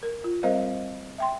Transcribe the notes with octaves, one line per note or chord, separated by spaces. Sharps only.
A#4
F4
G3 C4 A#4 C5 D#5 F5
E5 G5 C6